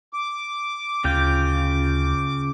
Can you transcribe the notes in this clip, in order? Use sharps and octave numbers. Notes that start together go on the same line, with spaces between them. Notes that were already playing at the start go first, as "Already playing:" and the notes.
D6
D2 C#3 F4 G5